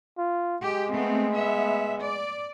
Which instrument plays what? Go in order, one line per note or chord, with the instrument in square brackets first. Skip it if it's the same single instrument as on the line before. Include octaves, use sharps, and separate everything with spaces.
[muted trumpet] F4
[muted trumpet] G#3 [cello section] G4
[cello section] A3 B3 C4
B3 E5
D5